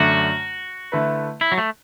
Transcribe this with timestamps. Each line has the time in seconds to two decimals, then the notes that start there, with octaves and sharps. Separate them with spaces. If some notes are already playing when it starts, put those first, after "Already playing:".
Already playing: F#2 D3 A3 D4 F#4
0.92 D3 A3 E4 B4
1.41 E4
1.52 F#3
1.58 A3